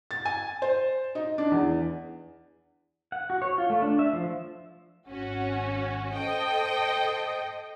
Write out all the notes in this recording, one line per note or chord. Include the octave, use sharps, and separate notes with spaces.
A6
G#5
C5
D#4
D4
E2
F#5
F#4
C#5
F4
A3
D4
E5
F3
G#1 C#4 F#4
A4 C5 D#5 G5